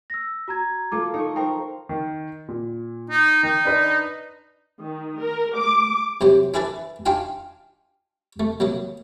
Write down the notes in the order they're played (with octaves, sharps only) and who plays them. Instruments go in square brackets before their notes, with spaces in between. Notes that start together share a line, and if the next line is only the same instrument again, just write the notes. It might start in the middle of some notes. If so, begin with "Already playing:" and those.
[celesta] E6 A#6
F#4 A#5 G#6
[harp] A#3 F4 A4 [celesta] D6
[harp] D#4 C#6 [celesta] A4
[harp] D#4 A#4 C5 [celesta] G5
[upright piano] D#3
A#2
[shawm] D#4
[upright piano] D#3 [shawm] D#4
[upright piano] D4 B4 D#5
[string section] D#3
A#4
D6
[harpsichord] C3 F#3 C5
D4 E4 G#4 A4 B4 D5
D4 D#4 F4 F5 G5 G#5
A3
F#3 A#3 D#5